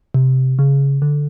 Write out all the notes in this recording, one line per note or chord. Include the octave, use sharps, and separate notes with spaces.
C3
C#3
D3